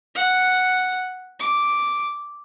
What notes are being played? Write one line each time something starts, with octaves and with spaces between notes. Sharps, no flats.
F#5
D6